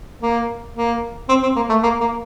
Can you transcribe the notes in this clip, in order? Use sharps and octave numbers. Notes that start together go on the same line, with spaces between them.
A#3
A#3
C4
C4
A#3
A3
A#3
A#3